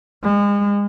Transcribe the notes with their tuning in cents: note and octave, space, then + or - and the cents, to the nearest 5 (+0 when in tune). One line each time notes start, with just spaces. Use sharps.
G#3 -35